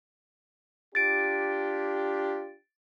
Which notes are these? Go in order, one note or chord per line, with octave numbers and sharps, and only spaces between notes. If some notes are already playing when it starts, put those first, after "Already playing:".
D4 F4 G4 A6 D7